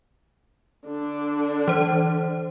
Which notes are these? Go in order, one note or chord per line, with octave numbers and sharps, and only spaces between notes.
D3 D4
E3 C5